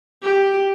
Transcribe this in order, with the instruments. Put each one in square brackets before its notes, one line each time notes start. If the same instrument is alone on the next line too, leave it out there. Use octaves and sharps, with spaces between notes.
[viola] G4